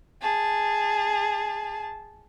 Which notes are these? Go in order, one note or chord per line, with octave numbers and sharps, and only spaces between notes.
G#4 A5